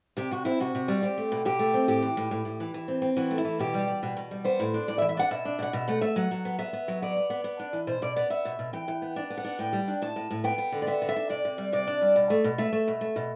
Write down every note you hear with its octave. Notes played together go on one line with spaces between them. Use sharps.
C3 G4
C3 F#4
C4 E4
C3 F#4
C3
G3
C4 G4
A3
B2
B2 G4
A3
C4
A2 G4
E3
A2
A2
A2
E3
E3
C4
C4
E3 F#4
A3
E4
E3
B2 G4
G3
G3
B2
B2
G3
B3 C5
A2
D4
A2 D5
E5
E3
E5
D4 F#5
B2 E5
D4
B2 F#5
B2 E5
A3 F#5
A3 E5
F#3 F#5
F#3
B3
B3 E5
B3
F#3
B3 D5
B3
B3
B3
D4
E3
B2 C5
B2 D5
B3 D5
B3 E5
B2
B2
E3 G5
E3
B3
D4
B3
F#5
D4
A2 G5
G3
D4
A2 A5
A2
A2
B3 G5
B3
D3
D5
B3 E5
D3
E5
D4
C3 D5
C3
G3
C3 D5
D4
G3
B2
A3
B2
A3 E5
A3
B2
A3
B2